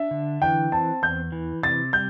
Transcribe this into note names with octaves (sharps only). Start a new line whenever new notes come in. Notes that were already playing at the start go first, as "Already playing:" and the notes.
Already playing: D4 E5
D3
E3 G5
C4 A5
E2 G6
E3
C3 A6
G3 G6